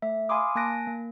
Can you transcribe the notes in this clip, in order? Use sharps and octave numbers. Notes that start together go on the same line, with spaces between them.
A3 E5
F5 G#5 B5 C6 D6 D#6
A#3 G#5 A5 F#6 A#6 D7
A#3